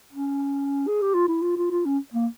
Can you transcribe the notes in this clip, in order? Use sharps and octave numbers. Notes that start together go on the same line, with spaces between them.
C#4
G#4
G4
F4
E4
F4
F4
F4
C#4
A#3